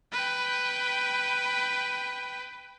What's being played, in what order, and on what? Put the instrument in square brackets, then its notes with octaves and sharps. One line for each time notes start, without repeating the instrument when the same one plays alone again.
[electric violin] B4 G5